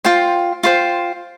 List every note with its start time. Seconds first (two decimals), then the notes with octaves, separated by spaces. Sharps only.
0.04 F4 C5 G5
0.63 F4 C5 G5